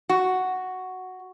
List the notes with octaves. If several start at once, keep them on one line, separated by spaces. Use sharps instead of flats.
F#4